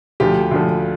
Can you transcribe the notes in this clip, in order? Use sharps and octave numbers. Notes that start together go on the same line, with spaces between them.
D2 D3 F3 G4
D2 D3 F3